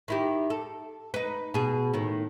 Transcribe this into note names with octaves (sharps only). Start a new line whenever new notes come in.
D#3 E4 G4
A4
D#4 B4
B2 G#4
A2 D#3